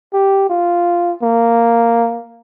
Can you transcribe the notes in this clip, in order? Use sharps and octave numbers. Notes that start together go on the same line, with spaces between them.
G4
F4
A#3